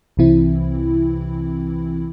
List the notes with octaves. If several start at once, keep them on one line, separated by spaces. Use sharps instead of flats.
C2 C3 E3 C4 E4